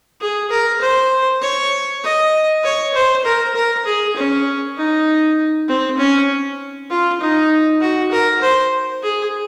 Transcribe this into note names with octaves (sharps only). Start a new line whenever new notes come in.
G#4
A#4
C5
C#5
D#5
C#5
C5
A#4
A#4
G#4
C#4
D#4
C4
C#4
F4
D#4
F#4
A#4
C5
G#4